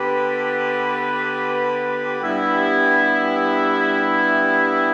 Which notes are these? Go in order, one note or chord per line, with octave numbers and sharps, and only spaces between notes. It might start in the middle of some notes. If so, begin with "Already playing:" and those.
Already playing: D3 B3 G4 B4
G2 G3 B3 E4